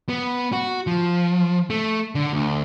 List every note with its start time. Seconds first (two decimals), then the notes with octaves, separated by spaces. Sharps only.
0.09 B3
0.53 F#4
0.87 F3
1.70 A3
2.15 D3
2.33 D2